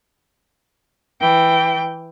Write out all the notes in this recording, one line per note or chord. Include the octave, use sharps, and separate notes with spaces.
E3 G5